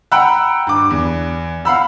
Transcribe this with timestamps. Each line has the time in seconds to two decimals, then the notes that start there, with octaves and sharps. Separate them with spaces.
0.12 F#5 G5 A#5 B5 E6 F#6
0.67 G2 D6
0.90 E2
1.65 F5 F#5 B5 E6